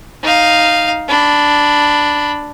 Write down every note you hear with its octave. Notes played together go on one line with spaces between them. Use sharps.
D#4 F5
D4 B5